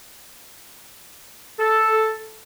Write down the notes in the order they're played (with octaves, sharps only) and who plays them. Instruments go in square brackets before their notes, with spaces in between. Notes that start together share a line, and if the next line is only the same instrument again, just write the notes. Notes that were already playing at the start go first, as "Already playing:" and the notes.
[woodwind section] A4